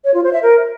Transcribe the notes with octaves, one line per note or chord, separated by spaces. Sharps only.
C#5
F4
C5
E5
A#4